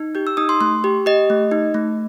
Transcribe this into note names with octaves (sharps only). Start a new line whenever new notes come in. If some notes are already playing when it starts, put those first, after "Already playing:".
Already playing: D#4
G4 G6
E6
D#4 D#6
C6
A3 C6
G4
G4 D#5
A3
D#4
A3